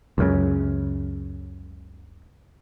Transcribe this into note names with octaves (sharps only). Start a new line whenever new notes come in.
C#2 F#2 C#3